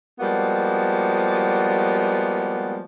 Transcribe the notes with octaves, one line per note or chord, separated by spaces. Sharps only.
F3 G3 G#3 A#3 B3 F#4